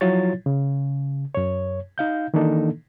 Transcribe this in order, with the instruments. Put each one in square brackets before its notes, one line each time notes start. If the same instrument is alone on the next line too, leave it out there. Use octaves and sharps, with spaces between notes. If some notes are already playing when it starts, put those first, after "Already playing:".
[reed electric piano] F3 F#3 E4 F4 C#5 A6
C#3
F#2 C#5
D#4 F5 G6
D#3 E3 A#3 D4 D#4 A4